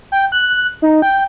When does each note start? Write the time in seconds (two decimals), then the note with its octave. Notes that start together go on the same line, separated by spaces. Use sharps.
0.12 G5
0.32 F#6
0.82 D#4
1.02 G5